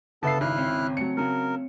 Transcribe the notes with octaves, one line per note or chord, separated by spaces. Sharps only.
G1 C#3 B3 A4 E5 A5 C7
G#1 E4 F6 F#6
C4 C#5
F#3 A3 C#7
C#3 F#3 A#4